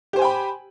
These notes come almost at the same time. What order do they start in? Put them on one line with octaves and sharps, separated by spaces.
G4 C5 G#5 G5 B5